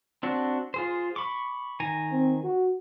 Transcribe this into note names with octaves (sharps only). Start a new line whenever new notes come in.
C4 D4 F#4
F4 G#4 C5
B5 C#6 D6
D#3 G#5 A#5
C4
F#4